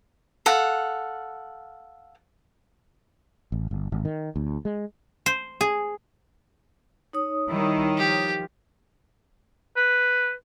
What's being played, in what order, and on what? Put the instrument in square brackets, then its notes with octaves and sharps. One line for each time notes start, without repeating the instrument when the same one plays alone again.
[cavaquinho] A4 F5 F#5
[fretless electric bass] A1
G1
G#1
D#3
D2
G#3
[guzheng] C5
G#4
[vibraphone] D#4 C#5 D#6
[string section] D#3 [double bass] G3 E4
[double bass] F3 [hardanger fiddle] G4
[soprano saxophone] B4